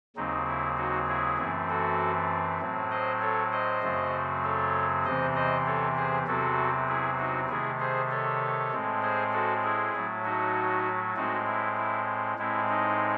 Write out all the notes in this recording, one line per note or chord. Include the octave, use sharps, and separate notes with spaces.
D#2 C#3 F#3 C4 D#4
E4
D#4 F#4
E4 G#4
F#2 E3 A3 C4
F#4 A4
A2 F#3 C4
C5 D#5
A4 C#5
C5 D#5
F#2 C#3 F#3 A3 C4
A4 C#5
E2 C3 E3 C4 C5 D#5
C5 D#5
A4 C#5
G#4 C5
E2 C3 F#3 C4 F#4 A4
E4 G#4
D#4 F#4
C3 D#3 A3 E4 G#4
G#4 C5
A4 C#5
A2 G#3 C4
G#4 C5
F#4 A4
E4 G#4
A2 F#3 A3
D#4 F#4
A2 G#3 C4 D#4 F#4
E4
E4
A2 G#3 C4 E4
D#4